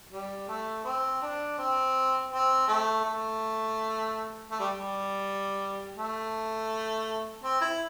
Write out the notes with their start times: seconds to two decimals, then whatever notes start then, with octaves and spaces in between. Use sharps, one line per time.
0.13 G3
0.49 A3
0.85 C4
1.22 D4
1.58 C4
2.32 C4
2.68 A3
3.05 A3
4.51 A3
4.60 G3
4.79 G3
5.97 A3
7.43 C4
7.61 E4